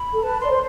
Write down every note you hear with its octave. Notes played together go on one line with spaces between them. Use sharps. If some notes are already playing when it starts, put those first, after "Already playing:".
Already playing: B5
A4
B4 A5
D5 C6
C5